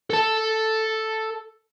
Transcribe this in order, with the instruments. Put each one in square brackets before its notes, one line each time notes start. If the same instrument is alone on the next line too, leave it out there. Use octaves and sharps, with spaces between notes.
[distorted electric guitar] A4 A5